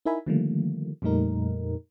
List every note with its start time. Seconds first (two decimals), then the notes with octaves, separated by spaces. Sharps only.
0.06 D#4 E4 A#4 E5 G#5 B5
0.26 D3 D#3 F3 G3 A3 A#3
1.02 F2 A#2 G3 A3 D#4 A#4